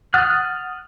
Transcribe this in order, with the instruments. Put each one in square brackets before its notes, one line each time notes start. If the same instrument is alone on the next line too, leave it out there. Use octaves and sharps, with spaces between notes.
[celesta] F#5 A6 [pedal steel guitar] D#6 F6 F#6